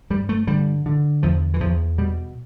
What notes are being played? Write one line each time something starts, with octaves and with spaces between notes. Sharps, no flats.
G2 G3
A3
D3 G3
D3
E2 F3
E3
E2 F3
B2 G3